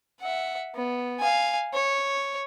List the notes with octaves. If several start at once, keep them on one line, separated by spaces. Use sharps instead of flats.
E5 F#5
B3
F5 G#5
C#5